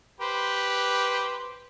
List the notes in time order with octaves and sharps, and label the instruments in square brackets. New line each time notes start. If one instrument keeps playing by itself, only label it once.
[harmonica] G4 B4 C5